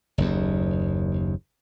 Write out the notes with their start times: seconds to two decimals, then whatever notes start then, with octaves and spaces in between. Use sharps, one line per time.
0.18 F#1 D#2